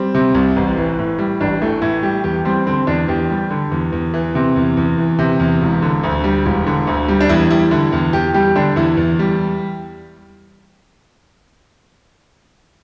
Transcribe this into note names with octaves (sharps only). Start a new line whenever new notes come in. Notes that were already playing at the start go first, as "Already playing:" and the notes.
Already playing: G3 C4
C3
C2
A1
E3
A2
G3
A1 D4
E3 A3
A2 E4
G3 G4
E2 G4
G3 C4
D3 C4
E2 D4
E2 G4
G3
D3
E2
E2
E3
C3
E2
E2
E3
C3
E2
E1
D3
D2
G3
E1
D3
D2
G3
D4
E2 E4
G3 E4
D3 E4
E2
E2 G4
G3 G4
D3 D4
E2 E4
E2
G3